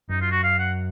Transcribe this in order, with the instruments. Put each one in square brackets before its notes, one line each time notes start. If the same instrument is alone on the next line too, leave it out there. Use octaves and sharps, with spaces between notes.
[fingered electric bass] F#2 [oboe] D#4
[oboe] F4
F#4
F5
F#5